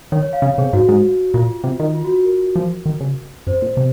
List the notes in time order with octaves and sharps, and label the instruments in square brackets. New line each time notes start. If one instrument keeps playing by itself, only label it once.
[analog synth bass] D#3 [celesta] C#5
[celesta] C#5
F5
[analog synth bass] C#3 [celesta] C#5
[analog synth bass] C3 [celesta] G#4
[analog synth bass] G#2 [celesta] F#4
[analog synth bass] G#2
[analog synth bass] A#2 [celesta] F4
[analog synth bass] C3
D#3
[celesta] F4
F#4
F#4
A#4
[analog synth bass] F3
D#3
C#3
[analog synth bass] F#2 [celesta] C5
[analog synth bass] A#2
C3